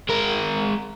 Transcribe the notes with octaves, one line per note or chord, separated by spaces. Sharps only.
G#3 A#4